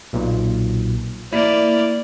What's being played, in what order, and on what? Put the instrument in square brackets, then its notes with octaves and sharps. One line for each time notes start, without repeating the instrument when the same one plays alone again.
[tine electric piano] B1 A#2
[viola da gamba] A#3 D5 [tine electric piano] E4